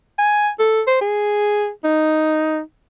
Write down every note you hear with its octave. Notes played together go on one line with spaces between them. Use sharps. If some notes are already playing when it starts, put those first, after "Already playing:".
G#5
A4
C5
G#4
D#4